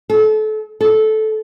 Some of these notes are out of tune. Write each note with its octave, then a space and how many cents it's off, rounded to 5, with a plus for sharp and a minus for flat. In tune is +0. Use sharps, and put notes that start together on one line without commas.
A4 -30
A4 -15